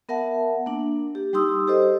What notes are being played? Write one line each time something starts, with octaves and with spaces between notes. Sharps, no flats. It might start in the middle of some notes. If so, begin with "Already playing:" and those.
B3 A#4 E5 F#5 A5
A#3 D4
G4
G3 D#4 G4 C6 D#6 E6
G4 A4 C5 D#5